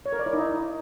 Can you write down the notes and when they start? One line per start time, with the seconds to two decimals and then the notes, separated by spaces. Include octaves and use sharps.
0.06 C#5
0.12 A#4
0.19 D5
0.26 E4
0.33 D#4